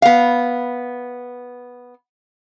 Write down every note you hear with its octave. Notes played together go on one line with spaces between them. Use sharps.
B3 F5